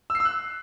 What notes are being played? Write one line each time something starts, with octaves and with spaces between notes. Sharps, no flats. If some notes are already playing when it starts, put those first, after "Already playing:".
E6
C7
E6
F#6